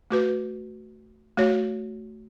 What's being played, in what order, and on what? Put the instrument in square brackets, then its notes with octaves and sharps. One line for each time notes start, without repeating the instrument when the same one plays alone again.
[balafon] A3 F#4 B4
A3 F#4 C#5